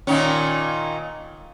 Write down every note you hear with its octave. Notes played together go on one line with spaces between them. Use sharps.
A#2 D#3 C#4